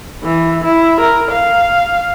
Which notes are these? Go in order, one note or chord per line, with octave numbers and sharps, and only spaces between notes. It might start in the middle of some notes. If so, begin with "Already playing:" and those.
E3
E4
A#4
F5